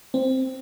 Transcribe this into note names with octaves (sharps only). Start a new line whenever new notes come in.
C4